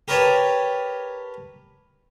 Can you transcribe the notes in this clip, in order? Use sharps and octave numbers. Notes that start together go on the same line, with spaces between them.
G4 A#4 B4 C#5 A5